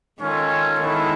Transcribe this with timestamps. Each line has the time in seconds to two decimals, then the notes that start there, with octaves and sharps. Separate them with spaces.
0.20 D#3 G#3 C#4 F4 A4 C#5
0.80 D#3 G#3 B3 E4 A4